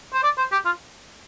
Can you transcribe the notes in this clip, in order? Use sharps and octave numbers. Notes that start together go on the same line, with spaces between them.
C5
D5
C5
G4
F4